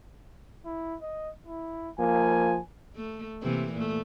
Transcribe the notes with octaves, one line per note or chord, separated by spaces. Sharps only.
E4
D#5
E4
F3 A#3 G#5
A3
C3 E3 A#3
A#2 A3